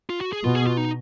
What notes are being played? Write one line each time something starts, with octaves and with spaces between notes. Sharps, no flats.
F4
F#4
G#4
B2 F4
G#4
F4
D#4